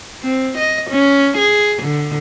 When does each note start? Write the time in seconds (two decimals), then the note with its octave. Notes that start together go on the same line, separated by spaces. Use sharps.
0.23 C4
0.58 D#5
0.90 C#4
1.37 G#4
1.83 D3